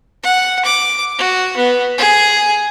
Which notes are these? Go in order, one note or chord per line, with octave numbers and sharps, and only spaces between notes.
F#5
D6
F#4
B3
G#4